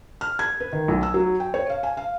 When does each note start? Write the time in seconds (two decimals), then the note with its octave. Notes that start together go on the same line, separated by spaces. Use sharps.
0.21 F6
0.39 G#6
0.60 B4
0.73 D#3
0.88 B1
1.03 E6
1.14 F#3
1.40 G5
1.54 C#5
1.70 F5
1.83 G#5
1.97 F5